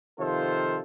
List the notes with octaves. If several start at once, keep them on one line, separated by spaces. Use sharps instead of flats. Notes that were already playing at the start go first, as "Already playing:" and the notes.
C3 D#3 F3 F4 A4 C5